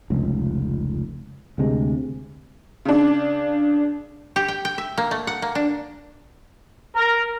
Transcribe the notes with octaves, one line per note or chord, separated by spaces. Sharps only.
F1 C#2
D2 C3 G#3
C#3 D4
G4
G5
G5
E5
A#3
A3
F#5
A#3
D4
A#4